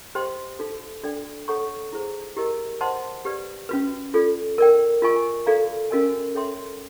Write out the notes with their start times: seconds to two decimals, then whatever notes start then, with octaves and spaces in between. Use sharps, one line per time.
0.15 G4 C5 D#5 G5 C6
0.59 D#4 F#4 A4
1.03 D4 F#4 A4 D5 G5
1.48 A4 C#5 F#5 A#5 C#6
1.93 E4 G#4 C5
2.37 E4 G4 A#4 D#5
2.81 C5 D#5 F#5 A5 C6
3.25 G4 B4 D5
3.69 C#4 F#4 B4
4.14 F4 A4 D5
4.58 A#4 D5 G5
5.02 F4 A#4 D#5 G#5 C#6
5.46 F#4 A4 D5 F5 A#5
5.91 C#4 F#4 A#4 D#5 G#5
6.35 A4 C#5 E5 G5 C6